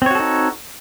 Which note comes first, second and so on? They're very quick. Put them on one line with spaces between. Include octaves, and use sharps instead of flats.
C4 C#5 F#4 A4 D#4